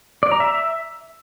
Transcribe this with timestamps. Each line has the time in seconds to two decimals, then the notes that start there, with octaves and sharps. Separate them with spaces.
0.23 D5
0.32 A#5
0.40 E5